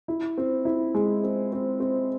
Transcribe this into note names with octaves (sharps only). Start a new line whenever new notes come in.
E4
C4
E4
G#3
C4
C4
C4